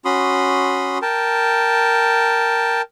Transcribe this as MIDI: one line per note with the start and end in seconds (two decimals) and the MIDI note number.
0.05 0.98 61
0.05 0.98 66
0.05 0.98 83
0.05 0.98 84
0.05 0.98 87
1.02 2.82 70
1.02 2.82 79
1.02 2.82 81